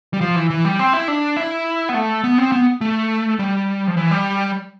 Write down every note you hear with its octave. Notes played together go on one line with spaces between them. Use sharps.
G3
F3
E3
E3
G3
C4
E4
D4
E4
B3
A3
B3
C4
B3
A3
G3
F3
E3
G3